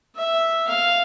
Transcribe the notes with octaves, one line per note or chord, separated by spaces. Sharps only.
E5
F5